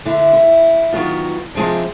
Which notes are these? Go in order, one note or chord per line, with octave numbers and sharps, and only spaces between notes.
D3 E4
E4
D#3 F#3 B3 F4
C3 F3 G#3 C4 D4